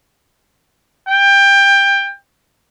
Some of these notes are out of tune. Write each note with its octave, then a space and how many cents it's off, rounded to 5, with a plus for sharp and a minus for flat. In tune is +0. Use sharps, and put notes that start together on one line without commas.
G5 +20